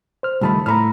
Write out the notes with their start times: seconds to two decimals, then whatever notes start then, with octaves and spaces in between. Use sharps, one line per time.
0.23 C5 F6
0.41 C#2 D#3 G3 A3 A5 B5
0.66 A2 A3 A#5 B5 F6